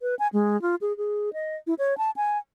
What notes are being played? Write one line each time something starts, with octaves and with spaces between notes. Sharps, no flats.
B4
G#5
G#3
F4
G#4
G#4
D#5
E4
C#5
A5
G#5